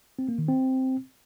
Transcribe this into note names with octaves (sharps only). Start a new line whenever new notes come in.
C4
A#3
D#3
C4